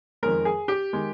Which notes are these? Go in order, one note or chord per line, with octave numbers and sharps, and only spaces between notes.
F2 D#3 G#3 A#4
G#4
G4
D#3 G#3